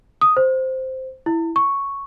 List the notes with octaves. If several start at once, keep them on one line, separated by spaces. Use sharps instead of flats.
D#6
C5
E4
C#6